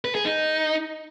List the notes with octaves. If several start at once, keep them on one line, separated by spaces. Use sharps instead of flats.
B4
G#4
D#4